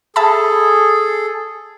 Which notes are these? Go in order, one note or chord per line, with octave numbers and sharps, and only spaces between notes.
G#4 A4 E5 A5 B5